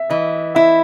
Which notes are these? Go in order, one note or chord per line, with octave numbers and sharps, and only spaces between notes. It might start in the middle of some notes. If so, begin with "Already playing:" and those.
Already playing: E5
E3 D#5
E4 E5